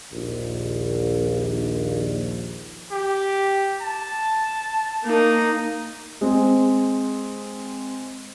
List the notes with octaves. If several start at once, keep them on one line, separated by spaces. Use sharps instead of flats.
A#1 D#2
G4
A5
A#3 D#4
G#3 C4